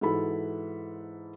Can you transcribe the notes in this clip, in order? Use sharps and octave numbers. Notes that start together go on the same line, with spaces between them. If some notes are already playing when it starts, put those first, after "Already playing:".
G#2 E3 E4 F#4 A4 B5